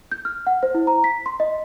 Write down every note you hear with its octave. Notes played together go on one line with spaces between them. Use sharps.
G6
F6
F#5
C5
E4
A#5
B6
C6
D#5